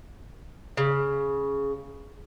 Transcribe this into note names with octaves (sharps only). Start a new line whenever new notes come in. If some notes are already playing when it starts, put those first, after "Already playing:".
C#3